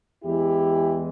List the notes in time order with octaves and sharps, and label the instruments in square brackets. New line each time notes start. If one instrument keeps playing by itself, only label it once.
[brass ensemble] E2 E3 G#3 E4 G4